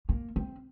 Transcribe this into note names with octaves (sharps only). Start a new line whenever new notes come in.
A#3
C4